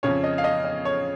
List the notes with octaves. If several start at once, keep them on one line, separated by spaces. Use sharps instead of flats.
F2 C#3 C#5
D#5
F5
D#5
D#5
C#5